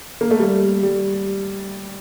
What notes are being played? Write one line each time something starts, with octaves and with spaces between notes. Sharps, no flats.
A#3
A3
G3
G3